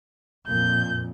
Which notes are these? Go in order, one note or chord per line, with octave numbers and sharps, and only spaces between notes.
F2 A#2 G6